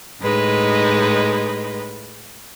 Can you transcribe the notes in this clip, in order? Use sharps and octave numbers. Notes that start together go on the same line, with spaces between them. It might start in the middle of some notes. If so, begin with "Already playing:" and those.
A2 G#3 D#4 B4